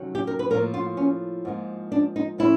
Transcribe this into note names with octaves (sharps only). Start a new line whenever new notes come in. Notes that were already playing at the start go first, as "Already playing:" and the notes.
Already playing: C3 D#3 F#3 A3 C#4
G4
A#4
B4
A2 F3 A#3 A#4
F4
C#4
G#2 F3 A#3
D4
D#4
A2 F3 A3 C#4 E4